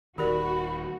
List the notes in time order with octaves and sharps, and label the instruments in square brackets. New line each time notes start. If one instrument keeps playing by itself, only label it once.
[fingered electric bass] D#1 D#3 [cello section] F#4 [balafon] G4 A#4 D5 [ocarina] B5